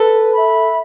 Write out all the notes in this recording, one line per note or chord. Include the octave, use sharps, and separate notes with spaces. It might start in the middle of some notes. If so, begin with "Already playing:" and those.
Already playing: A4 B4
E5 B5